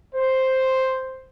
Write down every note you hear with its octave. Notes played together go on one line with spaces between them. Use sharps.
C5